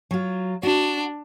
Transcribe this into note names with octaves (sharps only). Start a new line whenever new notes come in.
F#3 F4
D4 F#4